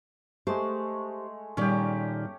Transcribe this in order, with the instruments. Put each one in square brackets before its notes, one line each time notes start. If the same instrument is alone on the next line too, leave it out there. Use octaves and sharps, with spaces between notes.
[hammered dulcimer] G#3 A3 [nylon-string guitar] G4 C5
[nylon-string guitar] A#2 D#3 G3 [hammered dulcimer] C#4 G4